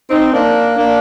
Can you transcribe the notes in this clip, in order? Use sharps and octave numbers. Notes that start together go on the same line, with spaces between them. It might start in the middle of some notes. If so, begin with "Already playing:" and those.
C4 D#4
A#3 D4
A#3 D4